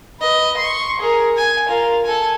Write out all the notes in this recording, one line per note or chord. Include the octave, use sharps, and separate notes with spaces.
B4 D#5
C6 C#6
G#4 A#4
G#5
F4 A#4
A4 G#5